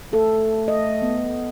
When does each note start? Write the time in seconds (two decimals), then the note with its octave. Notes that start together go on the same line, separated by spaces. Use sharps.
0.13 A3 A4
0.68 D#5
1.02 B3